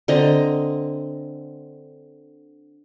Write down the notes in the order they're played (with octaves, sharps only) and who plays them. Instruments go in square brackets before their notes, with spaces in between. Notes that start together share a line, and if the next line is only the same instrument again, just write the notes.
[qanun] D3 C4 D#5 A#5